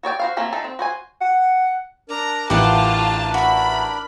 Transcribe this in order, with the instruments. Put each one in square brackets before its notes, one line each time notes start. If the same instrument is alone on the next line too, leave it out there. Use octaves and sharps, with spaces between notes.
[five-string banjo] F#4 C#5 D5 G5
F#4 C5 F5
A3 A#3 C4 C#4
A3 D4 D#4 A4
C4
F#4 C5 G#5
[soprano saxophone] F#5
[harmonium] D4 A#4 D5 [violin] A#5
[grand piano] A1 E4 [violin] F4 A5 [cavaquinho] G4 F#5
[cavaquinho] F#4 E5 [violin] B5